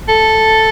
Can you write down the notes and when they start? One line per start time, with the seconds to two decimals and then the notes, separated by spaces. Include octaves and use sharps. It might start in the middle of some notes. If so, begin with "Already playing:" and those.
0.08 A4